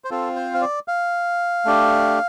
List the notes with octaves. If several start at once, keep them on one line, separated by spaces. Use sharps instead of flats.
C5
C4 F4 A4
C5
F5
D5
F5
A3 D4 G4